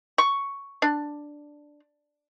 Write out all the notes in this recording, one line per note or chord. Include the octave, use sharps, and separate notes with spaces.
C#6
D4